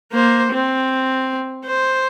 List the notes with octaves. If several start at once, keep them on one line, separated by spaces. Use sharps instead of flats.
A#3 C5
C4
C5